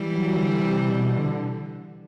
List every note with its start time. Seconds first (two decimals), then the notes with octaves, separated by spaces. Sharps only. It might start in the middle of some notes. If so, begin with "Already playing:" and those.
Already playing: E3 G3
0.15 F#3
0.37 D3
0.59 C3
0.88 B2
1.18 D3